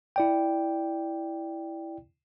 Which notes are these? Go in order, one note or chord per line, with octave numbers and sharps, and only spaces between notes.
E4 D5 G5